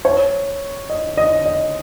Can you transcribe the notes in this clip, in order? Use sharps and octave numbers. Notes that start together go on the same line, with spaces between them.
C#5
D#5
D#5
D#5